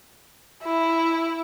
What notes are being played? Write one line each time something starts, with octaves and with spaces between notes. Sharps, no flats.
E4